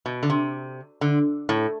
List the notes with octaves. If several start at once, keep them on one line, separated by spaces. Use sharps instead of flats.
B2
D3
C3
D3
A2